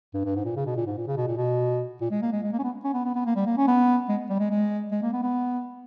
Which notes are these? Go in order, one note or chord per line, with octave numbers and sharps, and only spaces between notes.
G2
G2
G#2
A#2
C#3
B2
A#2
G#2
A#2
C#3
B2
A#2
B2
A#2
G#3
A#3
G#3
G#3
A#3
C#4
B3
C#4
B3
B3
B3
A#3
G3
A#3
C#4
B3
G#3
G3
G#3
G#3
G#3
A#3
B3
B3